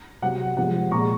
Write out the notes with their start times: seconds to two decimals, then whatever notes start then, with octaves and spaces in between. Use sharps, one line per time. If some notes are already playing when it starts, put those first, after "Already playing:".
0.22 C3 F#3 F#5
0.57 C3 F3 G#3 F#5
0.91 A#2 G#3 A#5 C#6